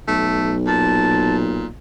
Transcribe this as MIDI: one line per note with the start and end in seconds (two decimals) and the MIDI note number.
0.08 1.67 35
0.08 0.55 57
0.67 1.66 46
0.67 1.36 81